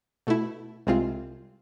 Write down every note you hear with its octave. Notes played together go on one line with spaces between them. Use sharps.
B2 A3 E4
C2 C3 G#3 C4 F4